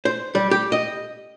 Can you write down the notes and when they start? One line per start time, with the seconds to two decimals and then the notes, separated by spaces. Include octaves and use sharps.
0.05 C5
0.35 G3
0.51 G4
0.72 D#5